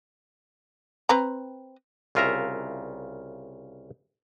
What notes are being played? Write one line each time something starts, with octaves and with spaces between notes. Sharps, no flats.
C4 B4 A#5
C2 C#3 F4 A#4 E5 A#5